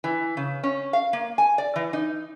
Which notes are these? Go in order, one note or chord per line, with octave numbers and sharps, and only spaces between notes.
E3
C#3
C#4
F5
A#3
G#5
D5
E3
D#4